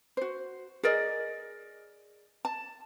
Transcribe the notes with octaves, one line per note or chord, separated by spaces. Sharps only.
F#4 C5
G#4 A#4 D5 D#5
A5